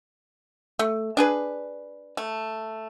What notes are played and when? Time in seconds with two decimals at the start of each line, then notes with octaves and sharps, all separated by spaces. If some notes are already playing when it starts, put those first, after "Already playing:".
0.79 A3
1.17 D4 G#4 B4
2.17 A3